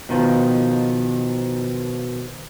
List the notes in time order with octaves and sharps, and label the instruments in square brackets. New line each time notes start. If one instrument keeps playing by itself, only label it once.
[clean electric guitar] B2 D#3 F3